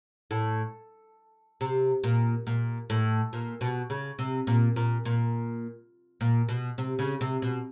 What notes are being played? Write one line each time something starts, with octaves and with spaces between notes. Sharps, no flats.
A2
C3
A#2
A#2
A2
A#2
B2
C#3
C3
A#2
A#2
A#2
A#2
B2
C3
C#3
C3
B2